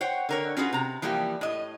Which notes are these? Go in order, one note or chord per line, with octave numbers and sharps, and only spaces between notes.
C5 C#5 F#5 G5
D3 A#4 C#5
C#4 F4 F#4 G#4 B4
C3 A#5
E3 F3 G3 A#3 G4
A2 D#5